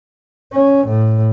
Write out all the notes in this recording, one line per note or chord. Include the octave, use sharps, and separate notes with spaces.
C#4
A2